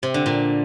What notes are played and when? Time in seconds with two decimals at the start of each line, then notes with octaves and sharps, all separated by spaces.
0.03 C3
0.14 D3
0.26 A#2